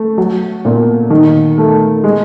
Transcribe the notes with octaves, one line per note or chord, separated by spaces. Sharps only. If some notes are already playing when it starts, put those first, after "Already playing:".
Already playing: A3
F#3
A#2
D#3
A3
G#3